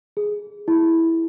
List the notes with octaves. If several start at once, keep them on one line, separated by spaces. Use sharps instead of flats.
G#4
E4